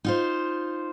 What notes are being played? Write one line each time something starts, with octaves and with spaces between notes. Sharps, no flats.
D#4 F4 C5